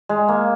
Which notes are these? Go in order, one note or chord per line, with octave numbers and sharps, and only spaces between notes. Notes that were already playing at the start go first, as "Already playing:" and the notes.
G#3
A#3